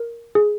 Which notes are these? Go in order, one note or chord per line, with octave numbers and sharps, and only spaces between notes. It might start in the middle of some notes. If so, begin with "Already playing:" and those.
Already playing: A#4
G#4